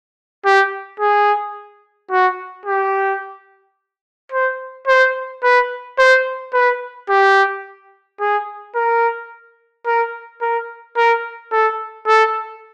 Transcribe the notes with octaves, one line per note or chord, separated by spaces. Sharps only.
G4
G#4
F#4
G4
C5
C5
B4
C5
B4
G4
G#4
A#4
A#4
A#4
A#4
A4
A4